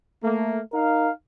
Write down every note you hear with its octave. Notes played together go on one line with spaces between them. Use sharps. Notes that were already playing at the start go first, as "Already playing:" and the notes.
A3 A#3
D#4 A#4 F5